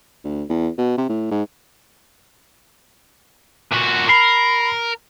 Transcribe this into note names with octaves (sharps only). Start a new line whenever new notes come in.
D2
E2
B2
C3
A2
G#2
A#2 F#4
A#4 B5 C7